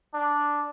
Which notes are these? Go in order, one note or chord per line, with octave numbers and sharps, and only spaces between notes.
D4